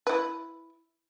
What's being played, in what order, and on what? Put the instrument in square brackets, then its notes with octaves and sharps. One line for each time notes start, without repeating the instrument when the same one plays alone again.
[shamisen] E4 B4